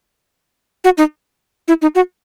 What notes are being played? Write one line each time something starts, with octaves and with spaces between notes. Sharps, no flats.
F#4
D#4
E4
D#4
F#4